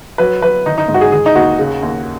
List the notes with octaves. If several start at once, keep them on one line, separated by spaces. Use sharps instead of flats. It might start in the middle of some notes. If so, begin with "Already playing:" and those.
F#3 B4
F#3 B4
D#3 D#4
D#4
G#2
F#4
G#4
D#3 G#4
D#4
D#2 F#4
C#3
D#2